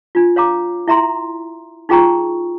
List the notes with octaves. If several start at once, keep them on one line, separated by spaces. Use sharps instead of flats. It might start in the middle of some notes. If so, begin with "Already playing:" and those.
D4 F4
C#5 F5 A#5 D6
E4 E5 A#5 C6
D#4 F4 G#4 G5 A#5 C#6